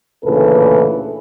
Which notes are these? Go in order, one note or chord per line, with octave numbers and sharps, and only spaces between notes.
D2 A#2 C#3 E3 A4 B4